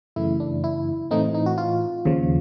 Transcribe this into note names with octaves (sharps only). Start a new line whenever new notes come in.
F#2 C#3 E3 A3 E4
D4
E4
A2 E3 A3 C4 D#4
D#4
F#4
F4
D#2 C#3 F3